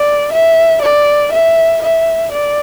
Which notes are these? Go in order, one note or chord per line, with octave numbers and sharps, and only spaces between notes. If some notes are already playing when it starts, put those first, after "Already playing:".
Already playing: D5
E5
D5
E5
E5
D5